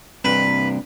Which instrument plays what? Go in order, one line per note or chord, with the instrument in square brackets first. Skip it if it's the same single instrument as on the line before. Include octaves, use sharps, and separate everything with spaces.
[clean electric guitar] G2 C3 D4 [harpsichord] B4